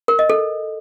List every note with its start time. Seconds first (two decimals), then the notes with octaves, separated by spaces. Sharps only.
0.08 A#4
0.19 D#5
0.30 A4